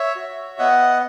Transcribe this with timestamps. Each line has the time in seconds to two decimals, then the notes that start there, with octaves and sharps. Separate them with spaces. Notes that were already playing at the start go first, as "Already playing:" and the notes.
Already playing: C#5 E5
0.16 F#4
0.59 B3 D#5 F#5